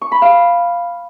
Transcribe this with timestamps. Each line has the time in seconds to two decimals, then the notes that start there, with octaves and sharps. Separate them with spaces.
0.02 C#6
0.12 B5
0.22 F5